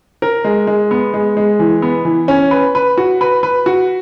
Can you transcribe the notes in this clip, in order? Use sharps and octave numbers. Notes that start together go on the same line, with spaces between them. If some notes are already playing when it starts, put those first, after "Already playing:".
A#4
G#3
G#3
B3
G#3
G#3
E3
B3
E3
C#4
B4
B4
F#4
B4
B4
F#4